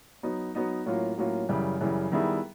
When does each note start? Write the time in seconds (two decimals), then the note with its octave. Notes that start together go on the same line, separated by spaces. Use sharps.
0.23 F#3 B3 D#4
0.55 F#3 B3 D#4
0.86 A2 F#3 A#3 C#4 F4
1.18 A2 F#3 A#3 C#4 F4
1.49 F#2 C#3 E3 G3
1.81 F#2 C#3 E3 G3
2.12 D#3 G3 B3 E4 G#4